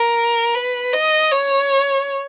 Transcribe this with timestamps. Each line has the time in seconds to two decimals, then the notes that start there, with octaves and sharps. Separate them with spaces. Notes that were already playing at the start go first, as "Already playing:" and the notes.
Already playing: A#4
0.55 B4
0.93 D#5
1.31 C#5